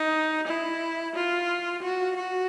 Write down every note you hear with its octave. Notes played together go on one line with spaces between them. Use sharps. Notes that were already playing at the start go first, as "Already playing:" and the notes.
Already playing: D#4
E4
F4
F#4
F#4